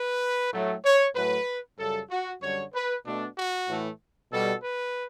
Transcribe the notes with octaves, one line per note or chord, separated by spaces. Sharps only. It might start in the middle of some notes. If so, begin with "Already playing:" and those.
Already playing: B4
A2 F#3 A3
C#5
A2 F#3 A3 B4
F#2 C#3 G3 A4
F#4
F#2 D3 G3 C#5
B4
B2 A3 D4
F#4
A2 E3 A3
B2 G3 A4
B4